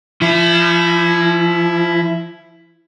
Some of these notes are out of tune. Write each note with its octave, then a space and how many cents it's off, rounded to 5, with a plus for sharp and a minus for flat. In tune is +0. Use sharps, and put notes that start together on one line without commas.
F3 -30 E4 +10